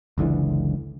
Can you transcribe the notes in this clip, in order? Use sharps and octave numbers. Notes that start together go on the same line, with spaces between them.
F#1 C#2 D3 E3